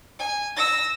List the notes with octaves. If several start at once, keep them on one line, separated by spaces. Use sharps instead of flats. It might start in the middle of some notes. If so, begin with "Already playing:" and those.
G#5
E6 A#6